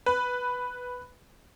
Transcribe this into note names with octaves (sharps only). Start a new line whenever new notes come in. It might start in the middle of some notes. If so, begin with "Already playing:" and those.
B4